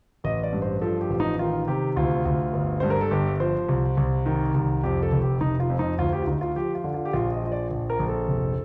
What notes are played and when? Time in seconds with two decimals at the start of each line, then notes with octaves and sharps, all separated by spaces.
0.24 A1 D#5
0.43 D5
0.53 G2
0.62 C5
0.81 F3 A4
1.01 G4
1.10 A1
1.20 D#4
1.39 D#3 F4
1.68 C3 G4
1.96 D2 F4
2.25 D2
2.53 G1
2.80 G2 C5
2.90 A#4
3.01 A4
3.11 G1 G4
3.40 F3 C5
3.68 C2
3.97 C2
4.26 D#3
4.54 C2
4.83 F2 G4
5.03 A4
5.12 F1
5.22 G4
5.41 F1 D#4
5.60 F4
5.70 F2
5.79 D#4
5.98 D2 F4
6.13 G4
6.22 F4
6.27 D2 D#4
6.41 F4
6.56 F3 G4
6.75 F4
6.84 D3
6.94 F4
7.05 G4
7.13 A#1 F4
7.32 D#5
7.42 F3 D#5
7.52 D5
7.71 A#1
7.90 A#4
7.99 A#1
8.09 A4
8.28 F1